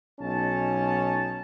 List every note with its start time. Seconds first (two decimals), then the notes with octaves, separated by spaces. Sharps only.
0.20 B1 C#4 D#4 A5